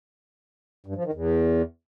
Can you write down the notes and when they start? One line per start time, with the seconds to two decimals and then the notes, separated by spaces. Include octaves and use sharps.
0.86 G2
0.95 F3
1.04 D#3
1.13 E2